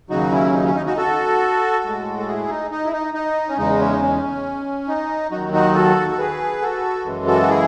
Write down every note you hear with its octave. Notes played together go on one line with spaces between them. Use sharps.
D#2 C#3 F#3 D#4 F#4
C#4 E4
D#4
C#4
D#4
D#4 F#4
F#4 A4
A2 G#3
A4
E4 G#4
D#4
D#4
E4
D#4
D#4
C#4
E2 C#3 G#3 D#4
C#4
D#4
C#4
D#4
D#2 D#3 F#3 D#4 F#4
D#4 F#4
F#4 A4
A4
G#4 B4
F#4 A4
F#2 C#3 E3 G#3
F#4 A4
F#4
E4 G#4